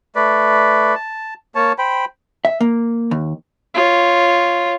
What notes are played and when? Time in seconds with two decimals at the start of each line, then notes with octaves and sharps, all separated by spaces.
0.16 A3 B4 D5
0.95 A5
1.55 A#3 C#5 A5
1.78 C5 G5 B5
2.45 E5
2.61 A#3
3.11 D#2
3.74 F4 C#5